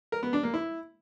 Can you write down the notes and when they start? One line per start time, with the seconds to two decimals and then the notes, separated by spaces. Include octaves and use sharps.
0.12 A#4
0.23 B3
0.33 D4
0.43 A#3
0.54 E4